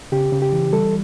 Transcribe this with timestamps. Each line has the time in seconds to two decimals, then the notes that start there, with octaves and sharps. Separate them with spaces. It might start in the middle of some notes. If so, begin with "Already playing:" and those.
0.12 C#3 G4
0.32 C#3
0.42 G4
0.52 E3
0.72 G3 A4